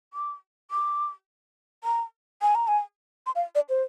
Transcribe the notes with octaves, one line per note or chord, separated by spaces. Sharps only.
D6
D6
A#5
G#5
A#5
G#5
C6
F5
D5
C5